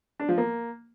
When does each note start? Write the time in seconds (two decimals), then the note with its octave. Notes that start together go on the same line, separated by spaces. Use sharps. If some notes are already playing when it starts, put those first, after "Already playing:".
0.20 D4
0.29 F3
0.38 A#3